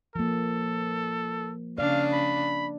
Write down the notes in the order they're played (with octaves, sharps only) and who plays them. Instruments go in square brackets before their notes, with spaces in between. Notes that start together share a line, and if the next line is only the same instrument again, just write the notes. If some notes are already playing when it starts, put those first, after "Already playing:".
[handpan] F3 A#3 [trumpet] A4
[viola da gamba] C#3 D4 [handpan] D5 [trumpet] F5
[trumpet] B5